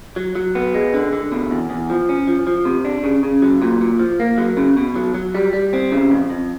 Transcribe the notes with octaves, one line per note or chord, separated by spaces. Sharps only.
F#3
F#3
B3
G#3
D3
D3
B2
E2
E2
F3
C#4
F3
F3
C3
D4
C#3
C#3
F#3
A#2
A#2
F3
A#3
F#3
C#3
B2
F#3
F#3
G3
G3
C4
C#3
F2
F2